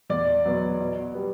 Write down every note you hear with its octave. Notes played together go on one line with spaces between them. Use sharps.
E2 D5
B2 F#3 B3
B2
G3 B3